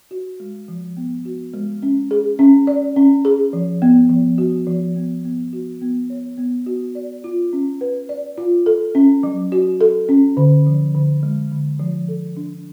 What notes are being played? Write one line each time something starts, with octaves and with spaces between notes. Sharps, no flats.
F#4
G#3
F3
B3
F#4
G#3
C#4
G#4
C#4
D5
C#4
G#4
F3
B3
F3
F#4
F3
B3
B3
F#4
B3
C#5
B3
F#4
D5
F4
C#4
B4
D5
F4
A4
C#4
F#3
F#4
A4
C#4
D3
F3
D3
G#3
D3
F3
A4
D4